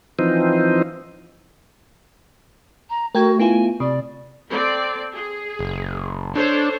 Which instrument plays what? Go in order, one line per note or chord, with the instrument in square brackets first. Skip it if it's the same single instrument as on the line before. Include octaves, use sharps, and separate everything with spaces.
[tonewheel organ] E3 F3 C4 D#4
[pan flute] A#5
[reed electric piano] A3 [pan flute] F#4 [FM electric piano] A#4 G5 G#6
[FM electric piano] B3 E4 F4 [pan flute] G#5
[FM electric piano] C3 [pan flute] D5
[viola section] C4 A4 D5
G#4
[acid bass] F#1
[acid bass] D4 [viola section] A4 C5 C#5